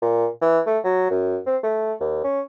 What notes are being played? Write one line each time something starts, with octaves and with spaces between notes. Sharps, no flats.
A#2
E3
A3
F#3
F#2
C4
A3
D#2
C#4